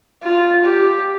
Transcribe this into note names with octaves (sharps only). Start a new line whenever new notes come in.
F4
G4